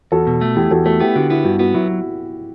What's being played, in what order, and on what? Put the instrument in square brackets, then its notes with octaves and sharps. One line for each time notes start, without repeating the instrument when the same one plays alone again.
[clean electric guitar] E2 [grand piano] F#4 A4
[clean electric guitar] B2
A3
[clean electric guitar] E2 [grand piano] E4 G4
[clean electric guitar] E2 [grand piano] F#4 A4
[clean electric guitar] A3 [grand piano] F#4 A4
[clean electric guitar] B3 [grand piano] E4 G4
[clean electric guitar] D3 [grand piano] F#4
[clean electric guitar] B3 [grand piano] E4
[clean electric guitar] G2 [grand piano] F#4
[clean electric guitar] B3 [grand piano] F#4
[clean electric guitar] F#3 [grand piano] E4